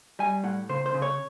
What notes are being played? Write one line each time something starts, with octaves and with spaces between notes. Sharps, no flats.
G3 G#5
A2 F#5
C#3 C5
C5
C#3
C#5